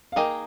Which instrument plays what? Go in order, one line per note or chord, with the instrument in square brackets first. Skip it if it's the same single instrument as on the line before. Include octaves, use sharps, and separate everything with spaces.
[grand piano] F5
[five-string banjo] A#3 D#4 G#4 D#5 [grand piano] G5